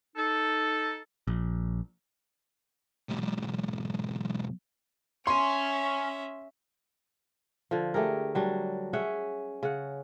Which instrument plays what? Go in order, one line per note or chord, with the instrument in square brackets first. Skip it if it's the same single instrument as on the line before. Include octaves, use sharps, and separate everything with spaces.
[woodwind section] D#4 A4
[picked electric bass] A#1
[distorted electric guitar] B1 G#2
[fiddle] C#4 E5 [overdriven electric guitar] C#5 G#5 [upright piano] C6
[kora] D3 F3
A3 G4 G#4 A#4
F#3 G3 D4
C#4 G#4 E5 F#5
C#3 F#5